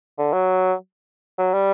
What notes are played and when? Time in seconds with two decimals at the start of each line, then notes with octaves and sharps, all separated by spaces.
0.18 D3
0.33 F#3
1.38 F#3
1.54 G3